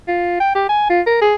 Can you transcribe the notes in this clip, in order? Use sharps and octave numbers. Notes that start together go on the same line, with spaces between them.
F4
G5
G4
G#5
F4
A#4
G#4